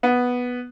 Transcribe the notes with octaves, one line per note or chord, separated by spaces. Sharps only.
B3